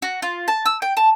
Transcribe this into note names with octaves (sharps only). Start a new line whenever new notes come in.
F#4
F4
A5
E6
G5
A5